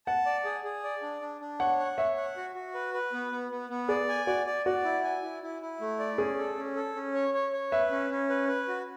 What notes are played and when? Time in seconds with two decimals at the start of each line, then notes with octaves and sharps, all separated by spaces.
0.06 F#5 A5
0.26 D5
0.45 G#4
0.64 G#4
0.84 D5
1.02 D4
1.21 D4
1.41 D4
1.60 C#5 F#5
1.79 F#5
1.98 C#5 E5
2.17 F#5
2.36 F#4
2.55 F#4
2.74 B4
2.94 B4
3.13 B3
3.32 B3
3.51 B3
3.70 B3
3.89 G#4 D5
4.09 G#5
4.27 F#4 D5
4.46 D5
4.66 F#4 D5
4.84 E4
5.04 G#5
5.23 E4
5.43 E4
5.62 E4
5.81 A3
5.99 D5
6.18 C#4 G#4
6.38 A4
6.57 C#4
6.76 A4
6.95 C#4
7.14 C#5
7.34 C#5
7.53 C#5
7.71 B4 E5
7.91 C#4
8.10 C#4
8.29 B4
8.48 B4
8.68 F#4